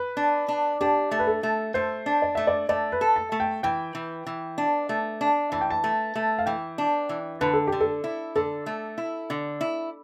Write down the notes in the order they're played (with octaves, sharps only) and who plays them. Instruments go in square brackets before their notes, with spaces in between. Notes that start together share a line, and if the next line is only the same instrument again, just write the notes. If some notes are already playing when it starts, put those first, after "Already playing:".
Already playing: [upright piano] B4
[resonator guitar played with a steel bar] D4
D4
[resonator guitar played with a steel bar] D4 [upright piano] G4
[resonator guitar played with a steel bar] A3
[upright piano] B4
A4
[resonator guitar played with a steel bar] A3
[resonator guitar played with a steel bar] A3 [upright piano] C5
[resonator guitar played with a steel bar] D4
[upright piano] D5
[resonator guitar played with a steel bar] A3 [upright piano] E5
[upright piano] D5
[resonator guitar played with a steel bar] A3 [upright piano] D5
[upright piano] B4
[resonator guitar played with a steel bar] A4
[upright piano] A5
[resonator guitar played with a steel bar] A3
[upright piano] G5
[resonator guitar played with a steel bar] E3 [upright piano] G5
[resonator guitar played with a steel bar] E3
E3
D4
A3
D4
[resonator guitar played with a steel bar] E3 [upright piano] A5
[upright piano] G5
A5
[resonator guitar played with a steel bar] A3
A3
[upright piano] F5
[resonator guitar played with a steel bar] E3 [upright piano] G5
[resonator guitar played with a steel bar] D4
E3
[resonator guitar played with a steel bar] D3 [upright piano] B4
[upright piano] A4
G4
[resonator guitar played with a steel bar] D3
[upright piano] A4
[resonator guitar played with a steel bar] E4
[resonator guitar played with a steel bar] D3 [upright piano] A4
[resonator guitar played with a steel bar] A3
E4
D3
E4